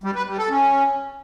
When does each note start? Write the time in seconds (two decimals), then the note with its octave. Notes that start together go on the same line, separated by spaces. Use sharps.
0.04 G3
0.15 B4
0.27 G3
0.38 A4
0.50 C#4